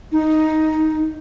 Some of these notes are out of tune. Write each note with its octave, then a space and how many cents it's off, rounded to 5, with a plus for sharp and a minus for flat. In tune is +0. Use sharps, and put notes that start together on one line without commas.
D#4 +5